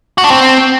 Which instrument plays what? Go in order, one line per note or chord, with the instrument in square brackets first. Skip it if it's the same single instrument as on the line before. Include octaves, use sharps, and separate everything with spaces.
[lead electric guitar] F#4
D4
C4